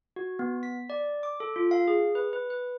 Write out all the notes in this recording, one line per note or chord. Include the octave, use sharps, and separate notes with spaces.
F#4
B3
B6
D5
D6
A4
F4
F5
G#4
B4
B4
B4